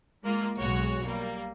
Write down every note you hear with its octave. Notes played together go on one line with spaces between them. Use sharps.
G#3 A#3 F4
B1 G#3 F#4 C#5
G3 A#3